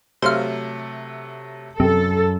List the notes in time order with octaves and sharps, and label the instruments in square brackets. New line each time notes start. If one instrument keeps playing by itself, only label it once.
[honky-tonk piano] C3 F#3 A3 [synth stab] C5 F5
[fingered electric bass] F#2 [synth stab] C3 [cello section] A4